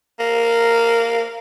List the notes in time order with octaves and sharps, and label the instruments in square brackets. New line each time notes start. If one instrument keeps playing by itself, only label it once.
[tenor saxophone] A#3